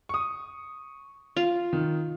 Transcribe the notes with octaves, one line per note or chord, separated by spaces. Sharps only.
C#6 D#6
F4
D#3